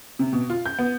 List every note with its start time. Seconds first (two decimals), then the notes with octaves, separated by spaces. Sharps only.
0.19 C3
0.33 B2
0.50 F4
0.66 G6
0.78 B3